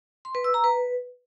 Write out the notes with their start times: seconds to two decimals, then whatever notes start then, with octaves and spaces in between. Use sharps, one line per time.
0.25 C6
0.35 B4
0.44 E6
0.54 A#5
0.64 B4